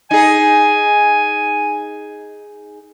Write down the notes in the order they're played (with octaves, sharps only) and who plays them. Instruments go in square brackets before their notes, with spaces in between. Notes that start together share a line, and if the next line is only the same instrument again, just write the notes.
[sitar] D#4 G#4 [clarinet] G#5